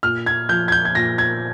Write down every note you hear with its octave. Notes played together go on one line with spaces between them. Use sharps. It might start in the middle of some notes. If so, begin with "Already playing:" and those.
A#2 F6
G#6
F3 G6
G#6
G6
G#6
A#2 A#6
G#6